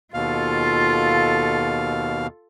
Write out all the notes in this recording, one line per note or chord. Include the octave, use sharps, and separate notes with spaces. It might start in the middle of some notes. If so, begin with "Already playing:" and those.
D#2 B2 F4 A4 F5